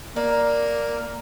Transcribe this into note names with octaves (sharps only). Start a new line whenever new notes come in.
A#3 D5